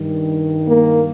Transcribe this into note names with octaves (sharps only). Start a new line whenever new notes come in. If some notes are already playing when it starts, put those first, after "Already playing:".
Already playing: G2 D#3
A#3